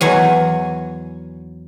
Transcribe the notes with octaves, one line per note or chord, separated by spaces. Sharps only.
E2 F#3 G#5